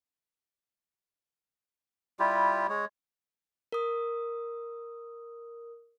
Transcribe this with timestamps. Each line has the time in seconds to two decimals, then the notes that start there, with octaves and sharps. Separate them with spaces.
2.19 G3 E4 F4 G4
2.69 G#3 C#5
3.72 A#4 D#6